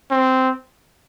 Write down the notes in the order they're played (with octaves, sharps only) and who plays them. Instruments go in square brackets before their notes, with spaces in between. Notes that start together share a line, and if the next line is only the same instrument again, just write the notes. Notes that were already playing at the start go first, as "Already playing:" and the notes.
[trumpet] C4